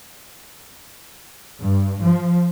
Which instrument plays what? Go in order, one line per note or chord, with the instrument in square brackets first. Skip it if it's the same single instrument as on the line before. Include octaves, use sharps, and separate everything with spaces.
[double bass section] G2
F3